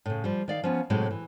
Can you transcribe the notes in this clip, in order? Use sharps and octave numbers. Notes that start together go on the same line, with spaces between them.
A2 C#3
F3 G3
D#3 D5 F5
F3 B3 C#4
A2 C3 F#3 G#3 D#4
E3